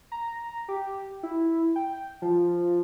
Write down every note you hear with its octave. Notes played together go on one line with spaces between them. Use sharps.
A#5
G4
E4
G5
F3